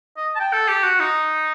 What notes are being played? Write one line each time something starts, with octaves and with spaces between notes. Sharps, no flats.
D#5
A5
G5
A4
G4
F#4
D#4